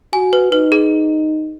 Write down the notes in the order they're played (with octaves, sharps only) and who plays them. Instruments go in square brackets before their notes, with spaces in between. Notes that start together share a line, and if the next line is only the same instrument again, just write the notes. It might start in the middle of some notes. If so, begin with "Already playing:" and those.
[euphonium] F#4 [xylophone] G#5
[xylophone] B4
[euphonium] D#4 [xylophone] B4
[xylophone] G#4